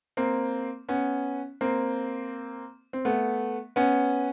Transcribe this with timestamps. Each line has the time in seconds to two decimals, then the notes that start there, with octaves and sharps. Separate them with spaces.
0.17 A#3 C4
0.89 B3 C#4
1.61 A#3 C4
2.93 C4
3.05 A3 B3
3.76 B3 C#4